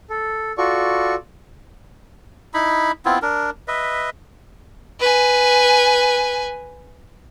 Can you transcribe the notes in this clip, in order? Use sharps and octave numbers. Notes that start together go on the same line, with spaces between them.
A4
F4 F#4 A4 D5 C#6
D#4 E4 B5
B3 C4 E4 F4
D4 A#4
B4 D#5 E5
B4 G#5